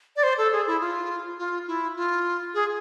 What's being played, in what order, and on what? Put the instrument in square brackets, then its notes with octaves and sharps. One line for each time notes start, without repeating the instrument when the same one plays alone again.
[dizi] D5
C5
A4
G#4
E4
F4
F4
E4
F4
G#4